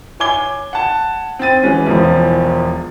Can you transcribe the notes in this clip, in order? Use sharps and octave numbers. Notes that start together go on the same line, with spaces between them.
C#5 G#5 D6 G#6 G7
F#5 A5
C4 G5 A6 D#7
E3 F#3 G#3 C#4
E1 E2 F3